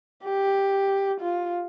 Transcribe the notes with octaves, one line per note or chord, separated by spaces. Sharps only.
G4
F4